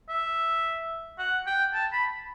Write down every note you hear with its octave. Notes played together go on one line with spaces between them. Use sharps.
E5
F#5
G5
A5
B5